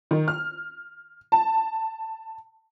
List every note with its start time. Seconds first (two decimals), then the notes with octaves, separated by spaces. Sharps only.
0.11 D#3
0.28 F6
1.32 A5